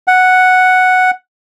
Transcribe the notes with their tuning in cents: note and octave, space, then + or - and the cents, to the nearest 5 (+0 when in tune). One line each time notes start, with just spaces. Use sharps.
F#5 +0